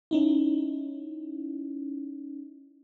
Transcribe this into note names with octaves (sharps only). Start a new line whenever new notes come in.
C#4 D#4 E4